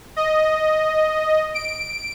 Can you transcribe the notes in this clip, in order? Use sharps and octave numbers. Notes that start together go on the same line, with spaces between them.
D#5
D7